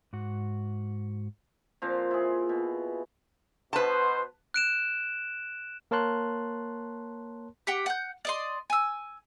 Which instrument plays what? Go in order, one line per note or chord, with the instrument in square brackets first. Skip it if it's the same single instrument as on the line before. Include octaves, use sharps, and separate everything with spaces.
[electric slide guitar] G#2 F#4
[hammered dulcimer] A#2 F3 C4 F5
E4 G#4
B2
[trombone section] B2 C5 [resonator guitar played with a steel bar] B4 A5
[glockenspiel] F#6 D7 E7
[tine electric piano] A#3 A#4 C#5 A5 C6 F#6
[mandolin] G4 F#5 G5
F#5 G6
D5 D#5 C6
G#5 E6